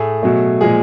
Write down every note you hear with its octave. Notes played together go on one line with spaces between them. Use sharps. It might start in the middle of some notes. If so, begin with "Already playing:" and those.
Already playing: A2 A3 G#4
B2 F#3 A3
A#2 F3 G#3 G#4